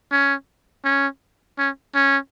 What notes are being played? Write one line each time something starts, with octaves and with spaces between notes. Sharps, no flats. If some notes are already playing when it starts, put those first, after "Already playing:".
C#4
C#4
C#4
C#4